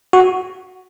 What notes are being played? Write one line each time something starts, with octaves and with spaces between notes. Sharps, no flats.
F#4